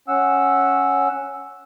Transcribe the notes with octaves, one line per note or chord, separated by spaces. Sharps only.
C#4 F#5 E6